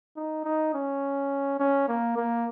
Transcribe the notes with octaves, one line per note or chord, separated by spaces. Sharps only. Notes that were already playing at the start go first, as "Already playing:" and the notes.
D#4
D#4
C#4
C#4
A#3
A#3